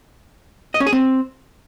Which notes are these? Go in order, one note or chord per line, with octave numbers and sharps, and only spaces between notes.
D#5
C#4
G#4
C4